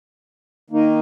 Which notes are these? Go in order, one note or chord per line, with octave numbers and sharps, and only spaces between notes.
D#3 A#3 D#4